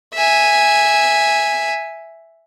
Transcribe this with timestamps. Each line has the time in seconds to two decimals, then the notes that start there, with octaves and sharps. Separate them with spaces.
0.14 E5 G#5